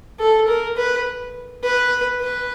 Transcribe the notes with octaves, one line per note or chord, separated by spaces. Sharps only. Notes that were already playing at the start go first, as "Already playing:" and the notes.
A4
A#4
B4
B4
B4